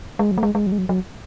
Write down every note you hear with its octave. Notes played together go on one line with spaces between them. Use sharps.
G#3
F#3
A3
G#3
G#3
F#3
G#3
F#3
F#3